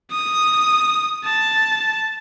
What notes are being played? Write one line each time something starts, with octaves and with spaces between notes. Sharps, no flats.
D#6
A5